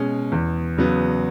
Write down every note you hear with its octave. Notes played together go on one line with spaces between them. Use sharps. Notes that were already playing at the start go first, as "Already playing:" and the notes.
Already playing: B2 G#3 C#4
E2
C#3 F#3 B3